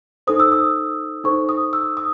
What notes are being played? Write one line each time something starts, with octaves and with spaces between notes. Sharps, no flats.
D#4 A4 C5 D#6
E6
D#6
D#4 A4 C5 C#6
D#6
E6
D#6